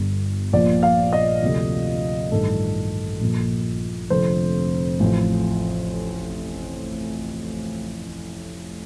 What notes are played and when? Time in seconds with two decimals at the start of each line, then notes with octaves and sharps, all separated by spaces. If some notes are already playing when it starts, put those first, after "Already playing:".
Already playing: G1 G2 D3
0.53 A#1 A#2 F3 D5
0.83 F5
1.13 D#5
1.42 D2 C3 F3
2.31 A1 G2 D#3 A4
3.21 A#1 A#2 F3
4.10 F1 F2 D3 F3 C5
5.00 A1 A2 F3